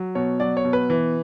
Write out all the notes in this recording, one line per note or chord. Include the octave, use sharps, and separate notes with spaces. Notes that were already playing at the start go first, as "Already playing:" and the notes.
Already playing: F#3
B2 C#5
F#3 D5
C#5
B2
B4
E3